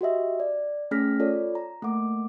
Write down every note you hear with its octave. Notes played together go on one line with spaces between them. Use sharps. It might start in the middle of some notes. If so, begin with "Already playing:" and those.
F#4 G4 D#5 E5
D5
A3 C#4 G#4 F6 A#6 B6
F4 A4 C#5 D5
A#5
A3 A#3 F#5 D6